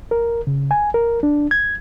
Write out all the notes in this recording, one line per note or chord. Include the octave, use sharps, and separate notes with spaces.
A#4
C#3
G#5
A#4
D4
G#6